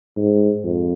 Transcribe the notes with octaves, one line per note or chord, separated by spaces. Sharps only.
G#2
F2